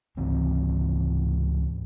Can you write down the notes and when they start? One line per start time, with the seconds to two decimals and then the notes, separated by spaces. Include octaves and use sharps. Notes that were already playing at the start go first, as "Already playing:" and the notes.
0.17 C#2 G#2 E3 C4